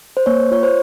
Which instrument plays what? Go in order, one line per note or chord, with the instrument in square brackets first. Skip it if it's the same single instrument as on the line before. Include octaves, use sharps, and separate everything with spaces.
[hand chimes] C5
A#3 C#5
F4 C#5
C5